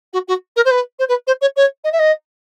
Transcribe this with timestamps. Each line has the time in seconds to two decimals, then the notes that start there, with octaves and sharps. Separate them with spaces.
0.13 F#4
0.28 F#4
0.56 A#4
0.65 C5
0.71 B4
0.99 C5
1.08 B4
1.27 C5
1.41 C#5
1.56 C#5
1.84 D#5
1.92 E5
1.99 D#5